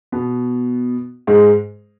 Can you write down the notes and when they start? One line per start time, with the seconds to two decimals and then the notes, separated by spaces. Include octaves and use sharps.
0.12 B2 B3
1.27 G#2 G#3